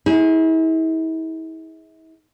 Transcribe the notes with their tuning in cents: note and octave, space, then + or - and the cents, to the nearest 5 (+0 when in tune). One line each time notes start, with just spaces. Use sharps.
E4 -40 G#4 +0